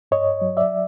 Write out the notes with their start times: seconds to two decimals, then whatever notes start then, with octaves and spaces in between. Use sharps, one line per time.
0.11 G2 C#5 D#5
0.42 F#3
0.57 D5 E5